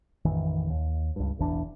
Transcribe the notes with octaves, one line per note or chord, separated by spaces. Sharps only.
A1 F2 D#3 E3
D#2
C#2 G2
E1 A1 E3 D4